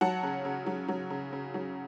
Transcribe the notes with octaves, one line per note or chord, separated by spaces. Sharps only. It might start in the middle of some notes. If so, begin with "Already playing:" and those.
F#3 F#5 A5
C#3
C#3
F#3
F#3
C#3
C#3
F#3